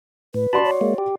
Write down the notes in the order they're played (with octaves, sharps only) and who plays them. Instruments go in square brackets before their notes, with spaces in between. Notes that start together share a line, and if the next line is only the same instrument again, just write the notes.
[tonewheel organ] A2 [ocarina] B4
[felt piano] F#4 D5 C6 [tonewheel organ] A5 B5
[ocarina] C#5
[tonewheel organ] G#3 A#3
G4